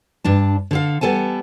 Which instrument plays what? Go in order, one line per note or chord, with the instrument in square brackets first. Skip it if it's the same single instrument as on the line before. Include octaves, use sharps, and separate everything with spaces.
[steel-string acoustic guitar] G2 D4 A5
D3 A4 F5
G3 B3 A4 G#5 A5